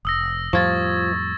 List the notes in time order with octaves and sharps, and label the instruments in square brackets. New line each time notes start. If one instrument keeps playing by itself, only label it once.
[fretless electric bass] F1 [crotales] D#6 E6 A#6
[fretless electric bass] F2 A2 G3 [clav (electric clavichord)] F3 F4 [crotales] C#6 G#6 A6